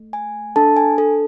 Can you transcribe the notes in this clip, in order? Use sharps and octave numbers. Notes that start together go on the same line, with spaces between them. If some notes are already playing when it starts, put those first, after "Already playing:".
Already playing: A3
G#5
D4 A4 A5
G#5
A4